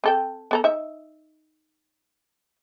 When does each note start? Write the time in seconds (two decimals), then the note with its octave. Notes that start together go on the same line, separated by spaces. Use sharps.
0.04 C4 A4 G5
0.51 B3 A4 A#5
0.64 D#4 E5